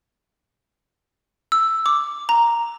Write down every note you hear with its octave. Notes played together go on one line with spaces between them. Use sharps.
E6
D6
A#5